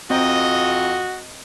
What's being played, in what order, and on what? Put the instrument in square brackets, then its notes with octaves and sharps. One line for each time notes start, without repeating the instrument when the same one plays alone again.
[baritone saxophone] F2 [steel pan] C4 G5 A#5 [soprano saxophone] F#4 [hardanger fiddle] D#5